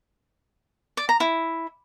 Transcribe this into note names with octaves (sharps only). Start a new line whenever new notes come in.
D5
A#5
E4